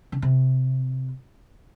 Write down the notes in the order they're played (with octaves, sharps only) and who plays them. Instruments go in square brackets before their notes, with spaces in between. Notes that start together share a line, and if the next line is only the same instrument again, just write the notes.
[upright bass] C#3
C3